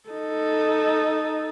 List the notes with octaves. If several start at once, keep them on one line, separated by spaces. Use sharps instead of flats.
D#4 A4